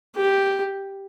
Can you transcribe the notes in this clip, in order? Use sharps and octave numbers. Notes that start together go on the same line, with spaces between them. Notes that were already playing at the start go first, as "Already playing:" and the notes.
G4